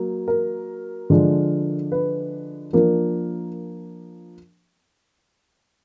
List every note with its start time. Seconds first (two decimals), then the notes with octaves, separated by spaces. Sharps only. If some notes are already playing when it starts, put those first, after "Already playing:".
Already playing: F#3 A#3
0.28 A#4
1.10 D3 F3 G#3 D4
1.92 B4
2.73 F3 A#3 D4 A#4